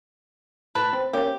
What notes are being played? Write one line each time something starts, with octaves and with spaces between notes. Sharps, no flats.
A2 B4 A5
C4
A#3 C#4 G4